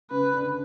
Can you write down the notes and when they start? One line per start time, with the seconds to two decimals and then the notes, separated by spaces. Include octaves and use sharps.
0.11 C#3 B4
0.33 D3